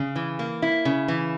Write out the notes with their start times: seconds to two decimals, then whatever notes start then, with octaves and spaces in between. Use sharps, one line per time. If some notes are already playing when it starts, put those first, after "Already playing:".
Already playing: C#3
0.16 E3
0.39 A#3
0.62 E4
0.85 C#3
1.08 E3